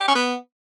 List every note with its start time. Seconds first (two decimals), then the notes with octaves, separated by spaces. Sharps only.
0.01 G4
0.08 C#4
0.15 B3